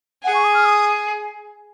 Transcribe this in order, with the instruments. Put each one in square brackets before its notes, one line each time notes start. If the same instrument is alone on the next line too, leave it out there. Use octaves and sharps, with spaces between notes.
[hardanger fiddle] G#4 [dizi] F#5
[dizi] C#6
D#6
F6
D#6